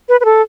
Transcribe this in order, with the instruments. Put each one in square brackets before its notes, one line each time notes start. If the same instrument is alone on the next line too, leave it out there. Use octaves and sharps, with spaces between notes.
[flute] B4
B4
A4